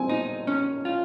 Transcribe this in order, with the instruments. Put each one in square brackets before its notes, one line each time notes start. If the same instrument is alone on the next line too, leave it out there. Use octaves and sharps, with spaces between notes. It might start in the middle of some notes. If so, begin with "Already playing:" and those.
Already playing: [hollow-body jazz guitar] C4 [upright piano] G#5
[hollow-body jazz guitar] D#4
C#4
F4